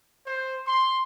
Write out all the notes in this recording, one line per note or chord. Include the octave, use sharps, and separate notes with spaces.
C5
C6